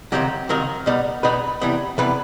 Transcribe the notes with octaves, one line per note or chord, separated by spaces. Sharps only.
C#2 C3 D#3 F#3 G4
C#2 C3 D#3 F#3 A#4
B2 G3 B3 D#4
B2 G3 B3 D#4 B4
C3 E3 G3 B3
C3 E3 G3 B3 B4